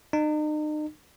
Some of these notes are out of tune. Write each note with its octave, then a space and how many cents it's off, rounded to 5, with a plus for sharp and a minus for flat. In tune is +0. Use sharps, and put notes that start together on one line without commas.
D#4 -40